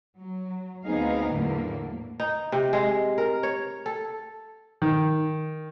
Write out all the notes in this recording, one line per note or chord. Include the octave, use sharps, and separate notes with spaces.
F#3
D2 B3 C4 D#4 G#4 F5
E2 A2 D3 F#3 A3 A#3
D#4
C3
G#3
A#4
C#5
A4
D#3